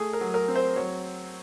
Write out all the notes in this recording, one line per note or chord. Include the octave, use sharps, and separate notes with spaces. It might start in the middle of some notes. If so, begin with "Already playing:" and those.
Already playing: A3 G#4
A#4
F#3
A#4
C4
C5
F#3 C#5